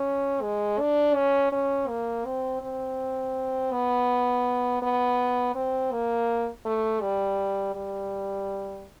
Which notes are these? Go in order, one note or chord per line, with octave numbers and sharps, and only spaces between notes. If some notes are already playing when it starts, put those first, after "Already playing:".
Already playing: C#4
G#3
D4
C#4
C#4
A#3
C4
C4
B3
B3
C4
A#3
A3
G3
G3